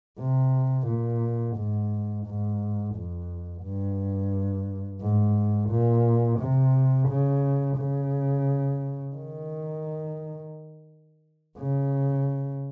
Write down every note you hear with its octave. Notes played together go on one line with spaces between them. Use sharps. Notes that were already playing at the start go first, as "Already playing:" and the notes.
C3
A#2
G#2
G#2
F2
G2
G#2
A#2
C3
C#3
C#3
D#3
C#3